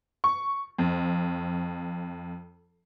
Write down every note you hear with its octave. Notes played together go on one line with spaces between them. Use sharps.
C#6
F2